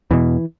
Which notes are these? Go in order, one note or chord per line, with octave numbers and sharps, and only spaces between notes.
E2 B2 E3